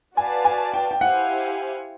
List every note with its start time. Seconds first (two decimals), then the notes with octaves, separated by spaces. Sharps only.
0.17 F#4 B4 D5 F5 G#5 A5
0.45 G#5
0.74 G5
0.91 G5
1.01 E4 G4 C5 F5 F#5 G#5